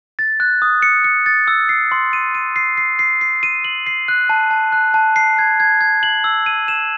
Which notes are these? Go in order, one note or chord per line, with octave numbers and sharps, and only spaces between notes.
A6
F#6
D#6
C#7
C#7
A6
E6
C7
C6
D#7
D#7
C7
C7
C7
C7
D#7
F#7
C7
F#6
A5
A5
F#6
A5
C7
G#6
G#6
G#6
F#7
E6
D#7
E7